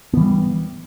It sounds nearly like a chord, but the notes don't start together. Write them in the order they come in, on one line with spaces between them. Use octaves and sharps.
B3 E3 G3